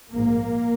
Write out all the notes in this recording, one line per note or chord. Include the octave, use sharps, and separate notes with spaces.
A#1 G#2 A#3